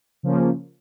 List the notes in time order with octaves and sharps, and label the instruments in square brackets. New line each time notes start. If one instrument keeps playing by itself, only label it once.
[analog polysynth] C#3 F3 A#3 C#4